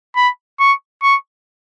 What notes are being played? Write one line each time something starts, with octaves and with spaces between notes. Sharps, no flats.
B5
C#6
C#6